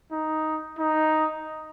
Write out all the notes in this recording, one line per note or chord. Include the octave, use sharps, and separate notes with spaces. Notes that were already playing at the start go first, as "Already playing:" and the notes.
D#4
D#4